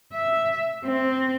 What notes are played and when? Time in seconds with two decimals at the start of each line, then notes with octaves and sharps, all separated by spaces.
0.14 E5
0.85 C4